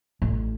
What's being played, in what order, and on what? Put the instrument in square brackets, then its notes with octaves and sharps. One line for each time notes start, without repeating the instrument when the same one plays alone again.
[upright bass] A1